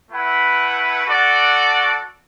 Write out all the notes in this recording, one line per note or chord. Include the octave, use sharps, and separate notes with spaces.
A3 E4 B4 F#5
F#4 A4 D5 F#5